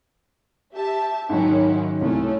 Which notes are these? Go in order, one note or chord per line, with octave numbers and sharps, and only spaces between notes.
G4 E5 A5
G#2 D#3 F#3 C#4 E4
C2 A3 C#4